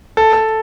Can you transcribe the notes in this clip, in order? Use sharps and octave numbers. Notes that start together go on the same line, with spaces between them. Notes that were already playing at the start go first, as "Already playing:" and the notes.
A4
A4